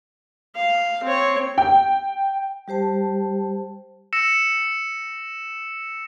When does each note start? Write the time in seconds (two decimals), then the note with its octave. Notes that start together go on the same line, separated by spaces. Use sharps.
0.55 F5
1.03 C4 C#5
1.58 G5
2.68 G3 G4 C5 A5
4.13 E6 A#6 C#7 E7